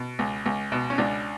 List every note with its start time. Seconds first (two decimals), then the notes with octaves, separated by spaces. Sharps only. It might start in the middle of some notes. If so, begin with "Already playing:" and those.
Already playing: B2
0.19 C#2
0.46 C#2
0.72 B2
0.90 C#4
0.98 C#2 D4